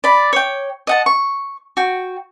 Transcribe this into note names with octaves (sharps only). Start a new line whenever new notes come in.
D5 B5
C#5 G5
D#5 F#5 A5
C#6
F#4 G5